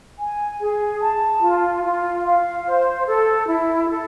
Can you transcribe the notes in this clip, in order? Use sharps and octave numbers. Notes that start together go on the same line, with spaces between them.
G#5
G#4
A5
F4
F4
F5
C5
A4
E4
A4